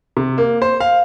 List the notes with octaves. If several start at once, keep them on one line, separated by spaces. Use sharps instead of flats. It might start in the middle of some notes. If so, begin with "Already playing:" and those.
C3
A#3
C5
F5